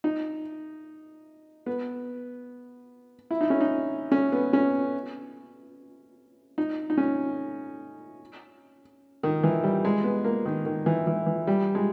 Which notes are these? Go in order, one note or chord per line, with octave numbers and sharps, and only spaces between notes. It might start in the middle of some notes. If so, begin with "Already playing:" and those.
D#4
B3
E4
D#4
C#4
D#4
C#4
B3
C#4
D#4
D#4
C#4
D#3
E3
G3
G#3
B3
A#3
D#3
D#3
E3
E3
E3
G3
G#3